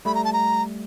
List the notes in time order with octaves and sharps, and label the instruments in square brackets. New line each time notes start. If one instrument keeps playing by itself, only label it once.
[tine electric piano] G3 A3 [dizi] B5
[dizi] A#5
A5
A#5